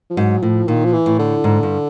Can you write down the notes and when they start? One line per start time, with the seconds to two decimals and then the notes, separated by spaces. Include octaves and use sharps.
0.10 F3
0.17 G#2 F#3
0.43 A2 F3
0.68 A#2 D#3
0.85 F3
0.93 E3
1.06 A2
1.19 D3
1.44 G#2
1.63 G2